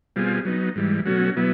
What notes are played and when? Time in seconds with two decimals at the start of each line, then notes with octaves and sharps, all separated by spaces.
0.16 B2 G3 C4 F4 G#4
0.45 F#3 B3 D#4
0.76 G#2 E3 G3
1.06 B2 F#3 A3 C#4 F#4
1.36 B2 F#3 B3 E4